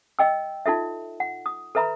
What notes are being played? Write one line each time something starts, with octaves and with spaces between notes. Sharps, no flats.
D#5 G5 E6
D#4 F4 A4 E5
F#5
D#6
A4 B4 E5 A#5 B5